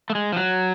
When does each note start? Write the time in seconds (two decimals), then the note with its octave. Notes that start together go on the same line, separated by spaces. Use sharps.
0.10 A3
0.15 G#3
0.32 F3
0.37 F#3